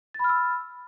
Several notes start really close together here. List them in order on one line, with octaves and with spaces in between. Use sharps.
A6 B5 F6 E6